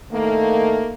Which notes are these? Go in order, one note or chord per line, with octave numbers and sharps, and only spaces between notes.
A2 D#3 A3 A#3